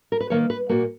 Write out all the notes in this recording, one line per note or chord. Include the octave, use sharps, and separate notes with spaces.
A#4
B4
D#3 F#3 A#3 C#5
B4
A#2 A#3 F#4